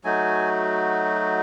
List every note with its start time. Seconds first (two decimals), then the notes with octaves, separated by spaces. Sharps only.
0.04 F#3 A3 D#4 F#4 G#5